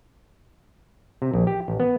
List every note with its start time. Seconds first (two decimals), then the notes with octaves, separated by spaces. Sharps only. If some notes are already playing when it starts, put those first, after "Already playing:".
1.22 C3
1.34 A#1
1.47 G4
1.68 A1
1.80 B3